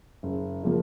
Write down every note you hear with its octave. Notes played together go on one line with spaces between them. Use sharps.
F#1
C#3 F3 A#3